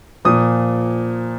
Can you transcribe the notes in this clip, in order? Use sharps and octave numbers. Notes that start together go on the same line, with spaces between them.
A#2 F3 D#6